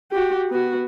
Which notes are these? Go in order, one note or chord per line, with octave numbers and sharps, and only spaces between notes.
F#4 G4
B3 F#4